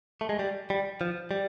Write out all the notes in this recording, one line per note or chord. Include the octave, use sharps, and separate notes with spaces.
A3
G#3
G3
G3
F3
G3